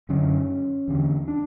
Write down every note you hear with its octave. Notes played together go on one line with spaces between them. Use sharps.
F#2 D3 C#4
E2 D3
D4